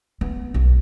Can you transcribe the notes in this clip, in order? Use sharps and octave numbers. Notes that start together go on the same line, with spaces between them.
B3
B1